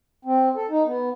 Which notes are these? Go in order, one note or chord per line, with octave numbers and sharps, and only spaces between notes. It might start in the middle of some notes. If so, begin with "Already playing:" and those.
C4
A4
D#4
B3